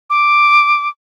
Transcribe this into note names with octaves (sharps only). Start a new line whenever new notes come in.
D6